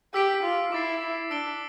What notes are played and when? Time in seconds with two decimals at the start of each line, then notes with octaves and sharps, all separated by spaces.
0.14 G4 E6 B6 D7
0.44 F4
0.72 E4 D6 A6 C7
1.31 D4 E6 B6 D7 G7